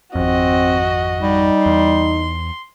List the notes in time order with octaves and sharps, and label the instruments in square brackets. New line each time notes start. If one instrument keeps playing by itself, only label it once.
[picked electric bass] G#1 F2 [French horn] C4 [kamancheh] F#4 D#5
[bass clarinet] G3 [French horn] D#4
[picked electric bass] E2 [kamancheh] C6